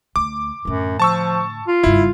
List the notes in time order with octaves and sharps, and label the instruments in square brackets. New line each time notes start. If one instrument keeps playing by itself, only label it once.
[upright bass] D2 [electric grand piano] D6
[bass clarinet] F#2 [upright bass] A2 D3
[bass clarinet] F3 [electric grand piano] A5 C#6 E6
[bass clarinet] F4
[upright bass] F#1 G2 [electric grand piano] E4